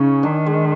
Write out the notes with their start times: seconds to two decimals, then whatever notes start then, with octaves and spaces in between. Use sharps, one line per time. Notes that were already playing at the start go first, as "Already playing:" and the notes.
Already playing: C#3 C#4 D#4
0.23 D#3 D4
0.46 G#3